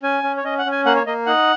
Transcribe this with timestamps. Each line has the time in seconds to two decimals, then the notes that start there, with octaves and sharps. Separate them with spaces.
0.03 C#4 G#5
0.23 C#4
0.37 C#5
0.44 C#4 D#5
0.59 F#5
0.66 C#4
0.72 G#5
0.85 A#3 F#5
0.95 C#5
1.06 A#3 D#5
1.26 D#4 F#5